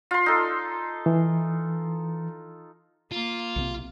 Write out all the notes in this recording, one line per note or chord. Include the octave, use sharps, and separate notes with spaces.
F4 C6
D#4 A4
E3
A#3 F4
B1 C3 C4